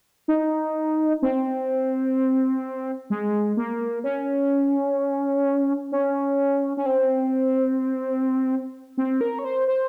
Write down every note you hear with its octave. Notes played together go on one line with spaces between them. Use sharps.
D#4
C4
G#3
A#3
C#4
C#4
C#4
C4
C4
A#4
C#5
C5
C5